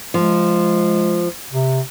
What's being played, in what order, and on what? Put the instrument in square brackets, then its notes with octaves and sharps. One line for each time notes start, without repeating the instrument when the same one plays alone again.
[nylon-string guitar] F3 [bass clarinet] G#3
[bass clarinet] C3